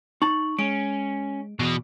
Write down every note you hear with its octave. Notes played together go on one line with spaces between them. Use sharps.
D#4 A5 C#6
G#3 C#4 D7
E2 B2